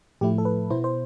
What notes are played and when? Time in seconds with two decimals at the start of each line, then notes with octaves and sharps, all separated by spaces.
0.21 A2 F3 A3 E4 G4
0.38 A4
0.45 B4
0.70 B2 B3 E4 C5
0.84 C5